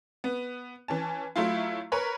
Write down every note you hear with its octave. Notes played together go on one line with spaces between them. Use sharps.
B3
E3 C#4 A5
F#3 A3 E4 F4
A#4 B4 C#5 B5